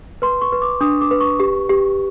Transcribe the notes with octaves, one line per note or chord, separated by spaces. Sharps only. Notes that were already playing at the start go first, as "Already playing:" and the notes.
B4 C6
C#6
B4
D6
D4 D#6
D6
B4
C#6
G4
G4